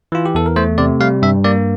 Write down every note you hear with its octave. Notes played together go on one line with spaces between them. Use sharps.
E3 F4
G4
E2 A4
A#4
A3 C5
C3 D5
G3 F5
G2 E5
A#3 D5